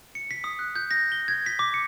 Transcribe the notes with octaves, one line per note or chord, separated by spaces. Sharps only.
C#7
B6
D#6
F#6
G6
A#6
G7
G#6
B6
D6
C#7